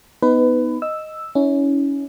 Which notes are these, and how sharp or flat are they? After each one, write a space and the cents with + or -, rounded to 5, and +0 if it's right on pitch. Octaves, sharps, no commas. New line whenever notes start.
B3 +0 D#4 +10 B4 +20
D#5 +0 E6 +0
C#4 +15 E4 -35